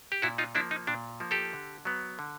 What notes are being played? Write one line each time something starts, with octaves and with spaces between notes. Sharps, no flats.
G4
A#2 E4 F#4
D#4 F4
F3 A#3 D4 E4
D#4
A#2 D4
F3 A#3
G4 A4
D3
F#3 B3
D3